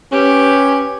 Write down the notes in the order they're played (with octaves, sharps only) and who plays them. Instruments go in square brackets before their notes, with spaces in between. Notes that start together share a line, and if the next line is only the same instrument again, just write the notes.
[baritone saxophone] C#4 [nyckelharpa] G4 B4